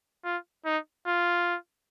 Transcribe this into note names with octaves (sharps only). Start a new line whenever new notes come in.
F4
D#4
F4